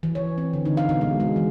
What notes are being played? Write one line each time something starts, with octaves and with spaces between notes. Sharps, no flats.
E3
C#5
C4
D3
D#4
F5
B2
G#3
G#3
E3